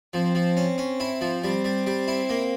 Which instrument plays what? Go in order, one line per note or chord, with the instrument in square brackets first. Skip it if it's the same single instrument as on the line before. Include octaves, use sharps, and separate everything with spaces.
[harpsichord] F3 [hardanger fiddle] C4
[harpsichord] F3
C#4
C#4
E4
F3
[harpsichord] G3 [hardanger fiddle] C4
[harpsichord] G3
G3
E4
A#3